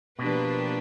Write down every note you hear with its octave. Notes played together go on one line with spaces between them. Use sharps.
B2 F3 A#3 D4 G4 B4